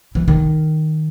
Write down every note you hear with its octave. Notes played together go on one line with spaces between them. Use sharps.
E3
D#3